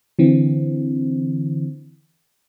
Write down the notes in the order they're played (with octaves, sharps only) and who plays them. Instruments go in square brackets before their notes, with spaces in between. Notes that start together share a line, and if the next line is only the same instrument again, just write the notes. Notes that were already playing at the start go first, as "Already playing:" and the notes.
[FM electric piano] D3 E3 C4